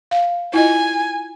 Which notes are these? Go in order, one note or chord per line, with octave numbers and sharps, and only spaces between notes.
F5
E4 F4 D#5 G#5